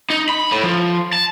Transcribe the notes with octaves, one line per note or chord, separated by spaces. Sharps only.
D#4
B5
A2
F3
A5